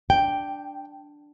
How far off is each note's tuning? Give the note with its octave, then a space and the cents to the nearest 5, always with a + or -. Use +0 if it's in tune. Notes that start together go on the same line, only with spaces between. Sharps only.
D4 +0 G5 +0